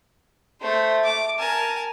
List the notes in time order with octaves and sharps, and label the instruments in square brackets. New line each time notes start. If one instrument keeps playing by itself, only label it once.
[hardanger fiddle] A3 [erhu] C5
[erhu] D6
[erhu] A#4 [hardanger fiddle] G#5 A5